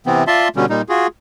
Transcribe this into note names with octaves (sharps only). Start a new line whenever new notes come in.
C3 E3 B3 C4
F4 D5 E5 A5 C6
B2 D3 G3 C#4
A#2 G3 D#4
F4 F#4 G#4